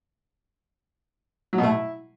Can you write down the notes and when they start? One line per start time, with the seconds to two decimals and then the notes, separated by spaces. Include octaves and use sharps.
1.53 F#3
1.58 B2
1.63 A3
1.69 E4